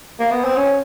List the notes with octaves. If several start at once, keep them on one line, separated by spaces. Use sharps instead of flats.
A#3
B3
C4
C#4